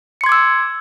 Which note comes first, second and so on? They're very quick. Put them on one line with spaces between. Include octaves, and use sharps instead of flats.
C#7 C6 G#6 D6 E6